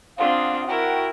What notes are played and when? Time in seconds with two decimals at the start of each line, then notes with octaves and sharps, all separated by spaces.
0.17 C4 D4 F4 F5 F#5 D#6
0.67 E4 F#4 A#4 G5